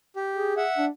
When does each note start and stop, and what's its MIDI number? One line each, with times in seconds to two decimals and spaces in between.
0.16 0.54 67
0.35 0.63 68
0.57 0.85 76
0.57 0.85 78
0.78 0.89 62